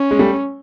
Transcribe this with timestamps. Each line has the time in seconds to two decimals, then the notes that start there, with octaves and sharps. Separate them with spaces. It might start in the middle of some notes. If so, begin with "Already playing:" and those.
Already playing: C#4
0.11 G#3
0.19 G3 A3